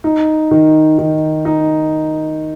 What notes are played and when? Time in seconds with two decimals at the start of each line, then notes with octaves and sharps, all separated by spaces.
0.04 D#4
0.51 D#3
0.98 D#3
1.45 D#4